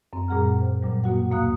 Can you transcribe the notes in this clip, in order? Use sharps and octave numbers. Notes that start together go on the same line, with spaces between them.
F#2 C4
A#2 G3 G#4 F#5 A#5 F6
C5
F#2 A#2 F#3 G3
B2 A#3 F#4 F#5
D2 B2 A#3 F5 D#6 F#6